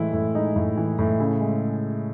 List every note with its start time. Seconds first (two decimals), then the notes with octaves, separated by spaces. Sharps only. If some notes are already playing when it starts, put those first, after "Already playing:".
Already playing: A2 E3 G#3 E4
0.13 A2
0.35 G#3 D#4
0.56 A2
0.77 E3
0.98 A2
1.20 C#3 E4
1.41 G#3